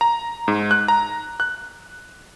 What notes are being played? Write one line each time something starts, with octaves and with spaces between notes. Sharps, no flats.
A#5
G#2
F#6
A#5
F#6